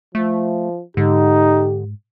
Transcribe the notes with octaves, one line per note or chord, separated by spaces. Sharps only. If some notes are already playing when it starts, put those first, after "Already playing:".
F3 A3
G#2 D3 D#4 G4